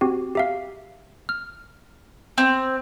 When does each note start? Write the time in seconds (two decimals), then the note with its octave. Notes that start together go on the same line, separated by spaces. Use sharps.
0.01 C4 F#4 G4
0.35 G4 E5 F5
1.29 F6
2.38 C4